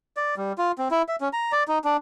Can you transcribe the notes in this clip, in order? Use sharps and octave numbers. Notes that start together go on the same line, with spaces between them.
D5
G3
F4
C4
E4
E5
C#4
A#5
D5
D#4
D4